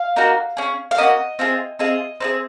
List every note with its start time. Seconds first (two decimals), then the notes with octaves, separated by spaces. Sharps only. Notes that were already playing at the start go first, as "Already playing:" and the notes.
Already playing: F5
0.16 A#3 D#4 F#4
0.57 C#4 G#4
0.91 F5
0.98 A#3 C#4 F#4 D#5
1.39 C4 F4 G#4
1.79 C4 F4 G#4 D#5
2.21 C4 D#4 G#4